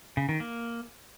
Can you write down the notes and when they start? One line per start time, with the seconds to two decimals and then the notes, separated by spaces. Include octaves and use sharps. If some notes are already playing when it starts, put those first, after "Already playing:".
0.17 C#3
0.29 D#3
0.40 A#3